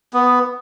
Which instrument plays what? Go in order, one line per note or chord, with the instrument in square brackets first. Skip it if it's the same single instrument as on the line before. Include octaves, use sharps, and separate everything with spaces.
[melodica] B3